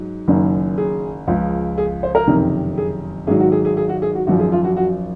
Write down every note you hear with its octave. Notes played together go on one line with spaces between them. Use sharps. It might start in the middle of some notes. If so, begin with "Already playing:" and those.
Already playing: G#2 F#3
F#1 F#2 D#3
G#4
C#2 C#3 F3
G#4
C5
A#4
F#1 F2 C3 D#3
G#4
G#1 G#2 D#3 F#3 G#4
F#4
G#4
G#4
G#4
F#4
G#4
F#4
G#1 F#2 F3 F#4
G#4
F4
F#4
F#4